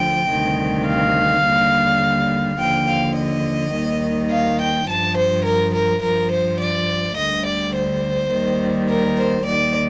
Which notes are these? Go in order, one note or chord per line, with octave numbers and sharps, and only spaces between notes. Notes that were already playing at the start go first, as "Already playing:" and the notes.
Already playing: D2 D3 F3 G5
D2 C3 D#3 G3
F5
D#2 D3 G3
D#2 D3 F3 G5
F5
D#5
D#2 D#3 G3
F5
G5
G2 F3 A5
C5
A#4
A#4
G2 F3 A#4
C5
D5
D2 D3 G3 D#5
D5
C5
D#2 D#3 G3
A#4
C5
D#2 D#3 G3 D5